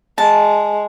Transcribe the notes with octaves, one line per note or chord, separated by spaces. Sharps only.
G#3 A5